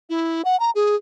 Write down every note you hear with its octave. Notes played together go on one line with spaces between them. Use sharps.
E4
F#5
A#5
G#4